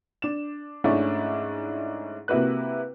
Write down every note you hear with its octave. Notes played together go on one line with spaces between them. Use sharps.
D4 E7
G#2 A3 C#4 D4 E4
C3 A#3 E4 F#4 B4 F#6